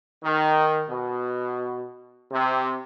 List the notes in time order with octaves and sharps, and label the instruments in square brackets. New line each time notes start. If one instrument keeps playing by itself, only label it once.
[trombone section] D#3
B2
C3